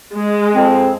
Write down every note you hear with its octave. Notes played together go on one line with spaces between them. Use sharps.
G#3
F2 C4